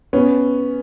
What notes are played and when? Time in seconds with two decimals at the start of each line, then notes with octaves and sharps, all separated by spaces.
0.13 B3 C#4